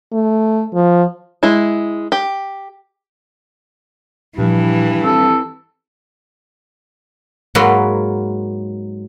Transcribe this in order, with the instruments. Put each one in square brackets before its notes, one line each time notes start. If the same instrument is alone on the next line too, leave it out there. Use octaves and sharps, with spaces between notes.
[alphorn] A3
F3
[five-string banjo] G#3 E4
G4
[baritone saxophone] G2 [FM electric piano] A#2 F3 [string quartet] E3
[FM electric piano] C4 G4 [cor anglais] A4
[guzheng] G#2 F#3 A#3 B4 C6